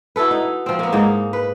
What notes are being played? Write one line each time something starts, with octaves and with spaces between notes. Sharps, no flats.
E4 F#4 A4 B4
D#4
F3 C4
A#3 B3
G#2 A#3 D#4
B4